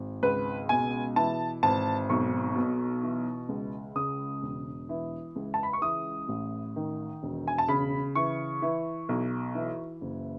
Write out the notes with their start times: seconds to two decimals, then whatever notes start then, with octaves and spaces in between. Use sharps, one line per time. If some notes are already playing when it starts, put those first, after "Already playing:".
Already playing: G#1
0.23 C#2 B4
0.69 B2 G#5
1.16 E3 A5
1.63 G#1 A5
2.09 B1 C#6
2.56 B2
3.03 E3
3.49 C#2
3.96 C#3 D#6
4.42 E1
4.89 E3
5.36 C#2
5.54 A5
5.63 B5
5.73 C#6
5.82 E3 D#6
6.28 A1
6.76 D#3
7.23 E1
7.48 G#5
7.58 A5
7.68 C#3 B5
8.15 E3 C#6
8.62 E3
9.09 B1
9.55 E3
10.01 F#1